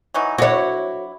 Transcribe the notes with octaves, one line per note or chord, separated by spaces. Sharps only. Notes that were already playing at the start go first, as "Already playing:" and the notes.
E3 F#3 D#4
F#3 D4 E4 F#4 C#5